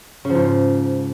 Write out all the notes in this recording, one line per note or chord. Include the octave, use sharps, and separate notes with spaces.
C#3
F3
G#2